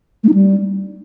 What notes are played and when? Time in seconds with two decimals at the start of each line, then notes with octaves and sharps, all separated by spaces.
0.24 A3
0.29 D#4
0.34 G3